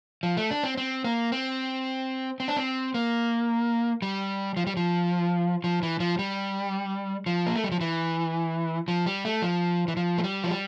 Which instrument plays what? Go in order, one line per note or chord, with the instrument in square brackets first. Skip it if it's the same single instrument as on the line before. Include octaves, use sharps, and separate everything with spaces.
[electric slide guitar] F3
A3
D4
C4
C4
A#3
C4
C4
D4
C4
A#3
G3
F3
G3
F3
F3
E3
F3
G3
F3
A#3
A3
G3
F3
E3
F3
G3
A3
F3
E3
F3
A3
G3
F3
G3